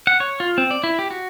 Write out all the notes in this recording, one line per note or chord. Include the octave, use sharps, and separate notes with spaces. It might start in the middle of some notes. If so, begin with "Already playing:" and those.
F#5
C#5
F4
C4
D5
E4
G4
F#4